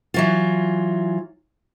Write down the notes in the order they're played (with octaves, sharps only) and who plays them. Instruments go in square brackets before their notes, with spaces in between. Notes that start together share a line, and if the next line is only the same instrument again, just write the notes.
[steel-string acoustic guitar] E3 F#3 F4